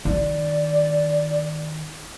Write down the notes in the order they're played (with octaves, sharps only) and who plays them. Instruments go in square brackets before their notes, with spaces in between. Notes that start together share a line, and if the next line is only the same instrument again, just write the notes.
[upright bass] D#3 [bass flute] D5